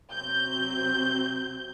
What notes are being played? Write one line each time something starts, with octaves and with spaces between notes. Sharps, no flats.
C3 F#3 C4 G6